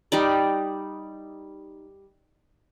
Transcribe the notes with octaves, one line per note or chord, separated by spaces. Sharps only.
G3 D#4 D5